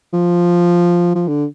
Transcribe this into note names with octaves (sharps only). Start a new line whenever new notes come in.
F3
F3
D3